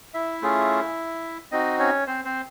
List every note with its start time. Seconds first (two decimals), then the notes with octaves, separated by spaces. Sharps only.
0.14 E4 E5
0.42 A3 C#4 F4 G#4
1.52 C4 D#4 F#4 D#5
1.79 C#4 C#5
2.07 C4 C5
2.25 C4 C5